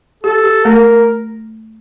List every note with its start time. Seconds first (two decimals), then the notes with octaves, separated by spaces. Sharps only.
0.23 G4 A4
0.44 G4
0.65 A3 A#4